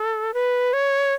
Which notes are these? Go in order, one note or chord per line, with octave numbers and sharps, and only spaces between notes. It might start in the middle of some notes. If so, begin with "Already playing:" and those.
Already playing: A4
B4
C#5